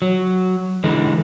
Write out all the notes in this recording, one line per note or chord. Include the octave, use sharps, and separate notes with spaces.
F#3
D3 E3 G#3